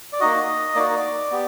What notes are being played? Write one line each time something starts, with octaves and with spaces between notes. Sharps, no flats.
D5
A#3 D#4 F#4 D#5
A#3 D#4 F#4 D5
B3 G4